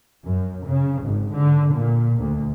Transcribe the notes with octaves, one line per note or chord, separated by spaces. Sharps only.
F#2
C#3
G#1
D3
A#2
D2